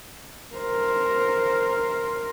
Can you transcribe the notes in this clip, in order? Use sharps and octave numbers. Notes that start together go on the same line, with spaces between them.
A#4 C5